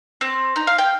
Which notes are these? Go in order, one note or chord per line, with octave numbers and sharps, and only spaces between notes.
C4
D#4
F5
G5